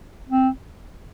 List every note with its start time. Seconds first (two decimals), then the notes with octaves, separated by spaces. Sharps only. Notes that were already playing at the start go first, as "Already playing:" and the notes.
0.29 C4